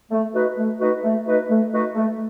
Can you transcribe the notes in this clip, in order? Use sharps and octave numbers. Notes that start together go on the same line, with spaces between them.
A3
D#4 F#4 B4
A3
D#4 F#4 B4
A3
D#4 F#4 B4
A3
D#4 F#4 B4
A3